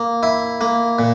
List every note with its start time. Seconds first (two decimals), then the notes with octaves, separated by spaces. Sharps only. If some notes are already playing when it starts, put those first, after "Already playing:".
Already playing: A#3
0.23 E4
0.61 A#3
0.99 A#2